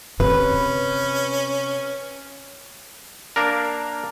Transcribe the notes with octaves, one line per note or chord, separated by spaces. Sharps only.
C3 C#4 B4
A#3 D4 A#4